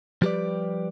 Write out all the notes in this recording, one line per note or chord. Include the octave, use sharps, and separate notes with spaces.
F3 G3 G4 A4 B4 D5